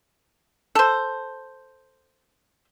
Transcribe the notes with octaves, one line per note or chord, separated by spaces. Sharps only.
A4 C5